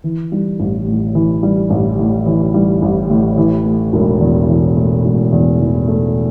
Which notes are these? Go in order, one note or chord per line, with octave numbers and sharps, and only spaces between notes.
E3
G3
A1
A2
E3
G3
A1
A2
E3
G3
A1
A2
E3
A3
E1
E2
E3
A3
E1
E2
E3
A3